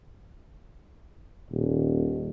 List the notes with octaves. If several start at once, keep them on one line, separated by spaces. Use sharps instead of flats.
D#1